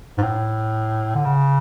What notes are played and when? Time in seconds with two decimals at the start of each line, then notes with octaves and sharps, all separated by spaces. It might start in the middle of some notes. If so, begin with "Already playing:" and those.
0.18 G#2
0.22 A2
1.15 D3
1.25 C#3